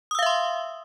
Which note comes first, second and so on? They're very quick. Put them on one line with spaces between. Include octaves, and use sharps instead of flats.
D#6 E6 F5 E5 C6